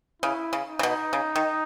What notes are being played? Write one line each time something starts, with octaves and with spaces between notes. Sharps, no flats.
C#3 E4
C#3
D#4
C#3
B2
C#3
D#3